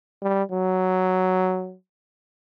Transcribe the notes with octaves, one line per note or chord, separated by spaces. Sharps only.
G3
F#3